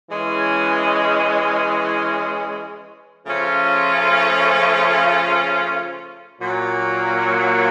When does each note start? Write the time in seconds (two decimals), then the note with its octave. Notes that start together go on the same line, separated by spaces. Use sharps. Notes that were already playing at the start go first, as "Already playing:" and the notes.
0.11 E3 G#3 C#4
3.26 C#3 F3 A3 C#4 F4
6.41 A#2 F#3 A#3